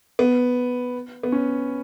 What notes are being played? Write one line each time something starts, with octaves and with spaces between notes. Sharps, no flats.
B3
B3
C#4